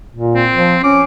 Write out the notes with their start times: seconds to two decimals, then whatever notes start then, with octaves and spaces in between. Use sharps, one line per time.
0.15 A#2
0.35 C4
0.55 F3
0.83 C#4 D6